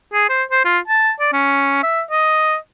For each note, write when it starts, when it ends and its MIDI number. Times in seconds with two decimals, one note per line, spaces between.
0.13 0.27 68
0.29 0.43 72
0.51 0.64 72
0.64 0.79 65
0.88 1.12 81
1.20 1.29 74
1.33 1.78 61
1.83 2.02 76
2.11 2.57 75